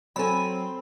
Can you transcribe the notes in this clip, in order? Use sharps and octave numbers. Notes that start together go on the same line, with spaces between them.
F#3 C4 A4 G#5 B5